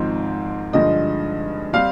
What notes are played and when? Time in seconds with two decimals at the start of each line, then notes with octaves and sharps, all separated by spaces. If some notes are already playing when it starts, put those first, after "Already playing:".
Already playing: G#1 G#2 F3 C4 D#4
0.73 G2 D3 F3 G#3 D#5
1.73 G3 C4 F5